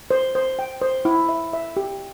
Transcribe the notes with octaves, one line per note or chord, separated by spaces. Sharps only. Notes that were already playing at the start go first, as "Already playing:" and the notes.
C5
C5
G5
C5
E4
E5
E5
G4